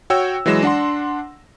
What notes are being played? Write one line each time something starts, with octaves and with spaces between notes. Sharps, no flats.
F#4 C#5 G5 E6
E3 F#3 G#3 A#6 E7
D4 F#5 C6